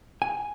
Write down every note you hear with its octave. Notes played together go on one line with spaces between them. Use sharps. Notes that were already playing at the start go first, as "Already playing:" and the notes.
G#5